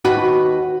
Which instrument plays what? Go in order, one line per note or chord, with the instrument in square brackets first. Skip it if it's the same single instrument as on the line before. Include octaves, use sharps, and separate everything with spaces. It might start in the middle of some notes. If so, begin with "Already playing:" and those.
[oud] D#2 F#4 B4